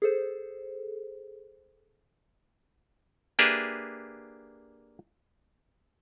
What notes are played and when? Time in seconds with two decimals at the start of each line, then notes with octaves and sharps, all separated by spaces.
0.02 G#4 A4 C5
3.39 A#3 D4 G4 G#4 B4 E5